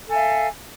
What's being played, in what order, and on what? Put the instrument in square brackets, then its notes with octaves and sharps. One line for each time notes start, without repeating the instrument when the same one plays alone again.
[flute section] A4
G#5
E5
F5